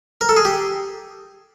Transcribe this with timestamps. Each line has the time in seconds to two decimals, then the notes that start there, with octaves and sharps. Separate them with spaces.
0.21 A#4
0.29 A4
0.36 G#4
0.45 G4